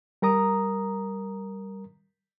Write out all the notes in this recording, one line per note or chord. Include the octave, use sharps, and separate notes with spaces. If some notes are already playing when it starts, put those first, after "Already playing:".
G3 A#4 A#5 D#6